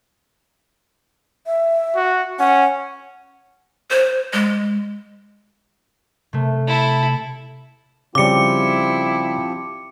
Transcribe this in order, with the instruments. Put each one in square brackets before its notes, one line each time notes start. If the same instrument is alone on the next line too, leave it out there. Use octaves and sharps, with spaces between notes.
[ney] E5
[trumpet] F#4
[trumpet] C#4 [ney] F#5
[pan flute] C5
G#3
[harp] C3 A3
[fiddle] E4 A4
[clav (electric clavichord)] C#3 G3 [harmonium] F3 C4 G4 [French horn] E4 [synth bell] D6 C#7